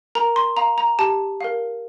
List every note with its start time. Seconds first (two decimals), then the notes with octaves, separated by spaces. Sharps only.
0.15 A#4 A#5
0.36 C6
0.57 F5 A#5
0.78 A#5
0.99 G4 A5
1.41 A#4 F5